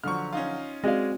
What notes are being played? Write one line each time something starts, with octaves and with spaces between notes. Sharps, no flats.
D3 F3 F#3 C#6 F6
C#4 D#4 F4
G#3 C4 F#4 D5 D#5 F5